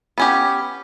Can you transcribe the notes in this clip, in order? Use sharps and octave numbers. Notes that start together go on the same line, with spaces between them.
B3 C#4 G4